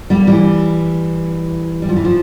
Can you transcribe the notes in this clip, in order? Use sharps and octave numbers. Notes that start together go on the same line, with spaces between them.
G3 A#3
E3 G3
G3
F3
E3
F3